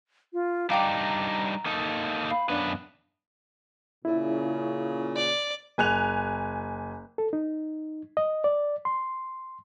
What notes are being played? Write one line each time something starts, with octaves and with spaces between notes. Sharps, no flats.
F4
G3 D4 D#4 F5 G5 A#5 D6
A#3 D#4 A4
F5 B5
F#2 B3 D4 B4
A#2 C#3 E4
D5
F#1 G#5 F#6 F7
A4
D#4
D#5
D5
C6